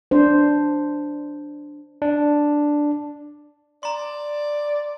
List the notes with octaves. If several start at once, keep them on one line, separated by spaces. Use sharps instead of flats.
D4 C5
D4
D5 A#5 C6